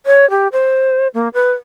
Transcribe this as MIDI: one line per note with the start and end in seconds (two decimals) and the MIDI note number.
0.06 0.29 73
0.30 0.48 67
0.52 1.08 72
1.14 1.29 58
1.34 1.52 71